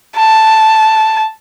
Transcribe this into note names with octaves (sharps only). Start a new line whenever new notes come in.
A5